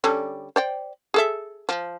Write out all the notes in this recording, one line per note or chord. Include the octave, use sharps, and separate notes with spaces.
D3 G3 C#4
C5 D5 G5
G#4 A4 E5
F3